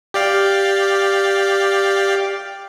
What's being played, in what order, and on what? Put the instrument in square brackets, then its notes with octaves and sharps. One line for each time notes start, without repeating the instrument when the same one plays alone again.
[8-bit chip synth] G4 D5 F5